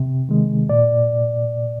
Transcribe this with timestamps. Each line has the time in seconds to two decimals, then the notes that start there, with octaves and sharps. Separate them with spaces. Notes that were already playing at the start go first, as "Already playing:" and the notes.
Already playing: C3
0.29 D#3 G#3
0.69 A#2 D5